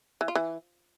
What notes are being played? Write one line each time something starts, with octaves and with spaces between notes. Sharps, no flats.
E3
F4
E3